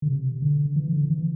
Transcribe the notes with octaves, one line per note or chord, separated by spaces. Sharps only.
D3
C3
D3
E3
D3
E3